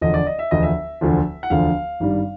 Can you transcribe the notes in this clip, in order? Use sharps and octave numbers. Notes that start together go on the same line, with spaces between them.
E1 D2 D3 F3 D#5
D5
D#5
E5
E1 D2 D3 F3 D#5
E5
E1 D2 D3 F3
F#5
E1 D2 D3 F3 F5
G#1 G2 D#3 G3